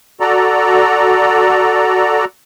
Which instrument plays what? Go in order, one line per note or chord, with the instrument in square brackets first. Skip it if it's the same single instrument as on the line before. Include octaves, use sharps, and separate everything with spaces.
[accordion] F#4 A4 D5 A#5